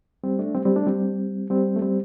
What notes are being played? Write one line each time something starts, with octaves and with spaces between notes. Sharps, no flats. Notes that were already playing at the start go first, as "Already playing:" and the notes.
G3 C4
A3 D4
G3 C4
G3 C4
A3 D4
G3 C4
G3 C4
A3
G3 C4